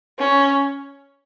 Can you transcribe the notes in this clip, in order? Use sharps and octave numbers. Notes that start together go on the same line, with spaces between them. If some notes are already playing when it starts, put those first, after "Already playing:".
C#4